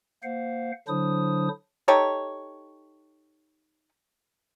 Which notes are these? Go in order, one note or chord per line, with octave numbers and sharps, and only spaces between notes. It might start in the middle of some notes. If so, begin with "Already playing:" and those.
A#3 C5 F5 F#5
D3 F#3 D4 E4 C5 D#6
D#4 G4 A4 C#5